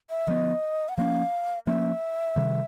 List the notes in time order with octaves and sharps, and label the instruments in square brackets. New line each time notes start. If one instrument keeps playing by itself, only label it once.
[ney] E5
[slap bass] D3 F3 G#3 B3 [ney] D#5
[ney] F#5
[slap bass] F3 A#3 C#4 [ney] F5
[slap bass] F3 A#3 C#4 [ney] E5
[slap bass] C3 D#3 G3